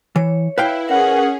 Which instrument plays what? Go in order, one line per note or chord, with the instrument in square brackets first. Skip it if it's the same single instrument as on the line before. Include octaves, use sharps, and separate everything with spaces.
[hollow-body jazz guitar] E3 [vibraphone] C#5
[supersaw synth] E4 [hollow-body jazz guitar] B4 F5 G5
[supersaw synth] C#4 G#4 [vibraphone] A#4 [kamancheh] F#5